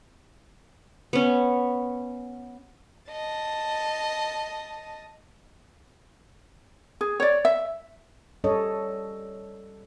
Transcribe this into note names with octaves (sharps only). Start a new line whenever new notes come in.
B3 C#4
D#5 A5
G#4
C#5 D5
E5
G3 C#4 A4 C#5 D#5